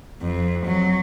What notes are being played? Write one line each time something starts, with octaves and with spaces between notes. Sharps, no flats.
F2
F#3